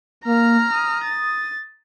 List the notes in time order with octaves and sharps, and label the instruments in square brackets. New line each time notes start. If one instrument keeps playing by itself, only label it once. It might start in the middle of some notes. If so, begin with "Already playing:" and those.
[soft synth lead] A#3 [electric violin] A#5 F6
[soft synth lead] D#6
[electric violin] A6